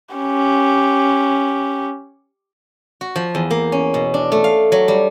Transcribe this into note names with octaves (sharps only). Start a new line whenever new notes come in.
C#4 G4
F#4
F3
E2
A#3
C#4
B2
D4
A3
F5
F#3
G3